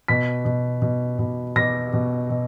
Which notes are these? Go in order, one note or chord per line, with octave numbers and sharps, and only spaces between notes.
B2 B6
B2
B2
B2
B2 A#6
B2
B2